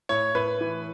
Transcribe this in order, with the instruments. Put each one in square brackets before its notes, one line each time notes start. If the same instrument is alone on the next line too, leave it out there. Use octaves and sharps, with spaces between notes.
[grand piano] A2 C#5
A2 B4
E3